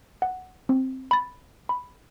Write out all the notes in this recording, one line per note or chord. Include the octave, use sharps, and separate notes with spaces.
F#5
C4
B5 A6
B5